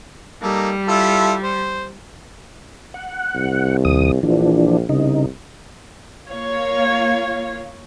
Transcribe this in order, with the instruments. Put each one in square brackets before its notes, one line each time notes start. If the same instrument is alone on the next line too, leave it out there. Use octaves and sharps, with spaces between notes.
[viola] G3 [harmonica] A#3 D#4 A4
[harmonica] E4 F4 A4
C5
[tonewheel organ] F#5
[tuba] C2
[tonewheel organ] D#2 D#6
[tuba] A#1 [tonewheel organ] E3 F3 D4
[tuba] C2 [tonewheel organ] C#3 D#4
[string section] A#3 F4 C#5 F5